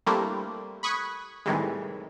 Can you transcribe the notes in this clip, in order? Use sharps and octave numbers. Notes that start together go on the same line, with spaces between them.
G3 A3 A#3 C4 D4 E4
B5 C#6 D#6 F#6 G#6 B6
A2 C3 D#3 E3 G3 G#3